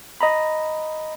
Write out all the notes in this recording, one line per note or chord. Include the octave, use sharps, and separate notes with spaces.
D#5 A#5 B5